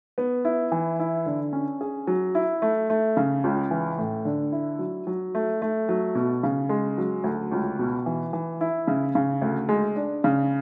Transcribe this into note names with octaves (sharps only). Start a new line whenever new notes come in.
B3
E4
E3
E4
D3
C#4
G#4
F#3
E4
A3
A3
C#3
C#2
E3
A2
D3
E4
F#3
F#3
A3
A3
F#3
B2
C#3
G#3
F#3
D2
C#2
B2
E3
E3
E4
C#3
C#3
D2
G#3
D4
C#3